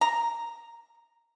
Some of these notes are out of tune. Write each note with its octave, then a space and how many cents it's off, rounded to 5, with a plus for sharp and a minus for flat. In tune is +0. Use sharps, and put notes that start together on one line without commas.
A#5 -5